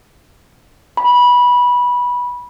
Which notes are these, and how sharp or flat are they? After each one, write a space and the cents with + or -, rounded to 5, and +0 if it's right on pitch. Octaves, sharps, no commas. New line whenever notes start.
B5 -15